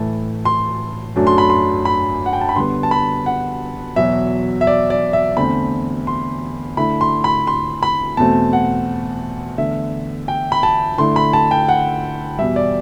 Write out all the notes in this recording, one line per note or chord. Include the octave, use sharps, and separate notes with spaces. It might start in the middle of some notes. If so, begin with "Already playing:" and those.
Already playing: A2 E3 A3 E4 A5
C6
F#2 F#3 A3 D4
C6
B5
C6
B5
F#5
G5
A5
B5
D3 G3 B3 C6
A5
B5
F#5
E2 B2 F#3 E5
E5
D5
D5
E5
E2 D3 A3 C4 B5
C6
D3 A3 E4 B5
C6
B5
C6
B5
E2 B2 A3 C4 A5
F#5
E2 D3 A3 E5
G5
B5
A5
D3 A3 E4 C6
B5
A5
G5
F#5
E2 B2 G3 E5
D5